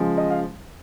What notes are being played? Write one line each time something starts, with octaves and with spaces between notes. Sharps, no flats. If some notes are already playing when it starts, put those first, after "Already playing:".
Already playing: C#3 F3 G#3
D#5
F5